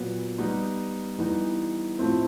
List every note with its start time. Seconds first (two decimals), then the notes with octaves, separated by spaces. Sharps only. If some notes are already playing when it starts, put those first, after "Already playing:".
Already playing: A#2 F#3 B3
0.38 G3 B3 D#4
1.18 E3 G3 B3 D#4
1.98 A2 F3 A3 C4 E4